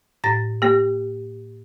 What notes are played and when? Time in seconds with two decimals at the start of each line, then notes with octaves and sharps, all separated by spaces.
0.24 A2 A6 A#6
0.62 A#3 G4